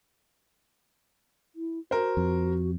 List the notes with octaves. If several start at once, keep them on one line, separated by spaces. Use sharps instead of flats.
E4
F#4 A#4 C5
F2